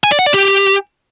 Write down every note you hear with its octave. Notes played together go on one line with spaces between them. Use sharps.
G#5
D5
F#5
D5
G4